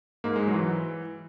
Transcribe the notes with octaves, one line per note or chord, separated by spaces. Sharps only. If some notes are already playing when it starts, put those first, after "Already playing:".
G#2 A#3
G#3
F#3
E3